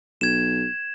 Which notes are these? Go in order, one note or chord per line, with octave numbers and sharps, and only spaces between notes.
B1 G#6 E7